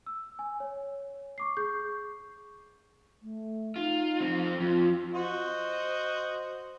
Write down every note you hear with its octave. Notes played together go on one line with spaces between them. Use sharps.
E6
G#5
C#5
C#6 D6 C7
G#4 C#6 G6
A3
D#4 F4
F3 C4
F2 F4
F#4 C5 D#5